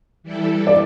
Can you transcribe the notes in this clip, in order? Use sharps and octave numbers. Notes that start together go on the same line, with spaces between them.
E3 G3 E4 A4
D5